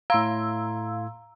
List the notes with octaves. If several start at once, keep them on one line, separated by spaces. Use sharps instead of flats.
A2 F5 A#5 C6 E6 G#6